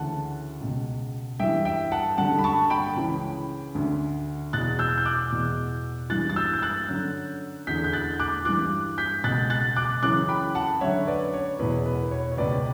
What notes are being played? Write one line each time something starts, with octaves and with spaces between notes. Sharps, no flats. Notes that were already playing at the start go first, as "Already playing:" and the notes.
Already playing: D2 C#3 E3 F#5 A5
C#2 B2
G2 E3 E5 G5
E5 G5
F#5 A5
G2 D3 F#5 A5
B5
A5 C#6
G5 B5
C#2 C#3 E3
D2 D3
E2 B2 F#6 A6
E6 G6
G6
D6 F#6
E2 B2
G2 E3 F#6 A6
A6
E6 G6
G6
F#6 A6
F#2 D3
E2 D3 G6 B6
G6
F#6 A6
D6 F#6
G2 E3 D6 F#6
G6 B6
C#2 B2 F#6 A6
F#6 A6
D6 F#6
F#2 C#3 E3 D6 F#6
G5 B5
F#5 A5
F#2 D3 C#5 E5
B4 D5
C#5
E2 B2 B4
B4
B4
C#5
C#5
C#2 B2 B4 D5
G5